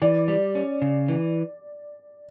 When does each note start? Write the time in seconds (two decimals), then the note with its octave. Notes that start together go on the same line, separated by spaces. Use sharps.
0.02 E3 D5
0.28 G3
0.55 C#4
0.82 C#3
1.08 E3